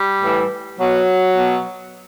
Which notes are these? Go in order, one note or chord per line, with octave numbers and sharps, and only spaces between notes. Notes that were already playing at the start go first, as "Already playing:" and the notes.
Already playing: G3
A2 E3
B2 F#3
B2